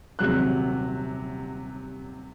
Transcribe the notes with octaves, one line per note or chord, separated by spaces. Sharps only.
D#1 C3 F#3 F#6